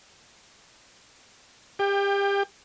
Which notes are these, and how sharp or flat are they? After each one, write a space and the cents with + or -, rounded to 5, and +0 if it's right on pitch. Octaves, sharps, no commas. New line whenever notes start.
G4 +30 G5 +15